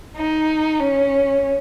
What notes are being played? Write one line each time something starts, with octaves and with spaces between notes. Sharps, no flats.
D#4
C#4